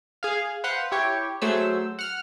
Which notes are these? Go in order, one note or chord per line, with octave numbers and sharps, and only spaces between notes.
G#4 F5
B4 C5 F5 F#5 C6
E4 G4 C#5 G5
F#3 A3 G#4 C5 E6
F#5 F6